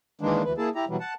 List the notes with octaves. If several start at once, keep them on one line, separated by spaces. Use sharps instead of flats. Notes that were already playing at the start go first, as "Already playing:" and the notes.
D#3 E3 G#3 A#3 D4
D2 E3 B4
A#3 E4 G#4 A5
E4 G4 A#5
B2 E3 F#3 G3
F#5 A5